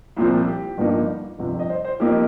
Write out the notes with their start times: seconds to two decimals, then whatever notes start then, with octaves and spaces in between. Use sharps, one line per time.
0.16 C2 A#2 F3 C4
0.47 G4
0.77 G1 G2 F3 A#3 D#4
1.39 G1 F2 C3
1.59 D#5
1.70 C5
1.85 C5
2.00 F2 F3 A#3 D#4 G4